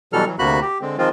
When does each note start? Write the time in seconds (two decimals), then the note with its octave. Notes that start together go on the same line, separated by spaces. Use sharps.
0.13 B2 E3 F#3 G3 A4 F6
0.26 E3 F#3
0.39 D2 C3 A#3 F#4 B5 F#6
0.61 G4
0.81 D3 G#3 C4
0.98 D#3 F3 G#3 C4 F4